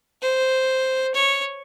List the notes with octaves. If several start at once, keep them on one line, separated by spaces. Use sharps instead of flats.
C5
C#5